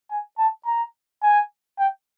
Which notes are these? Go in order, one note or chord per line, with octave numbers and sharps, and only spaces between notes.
G#5
A5
A#5
G#5
G5